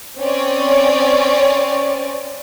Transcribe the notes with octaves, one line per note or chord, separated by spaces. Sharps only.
C4 C#4 C#5 D5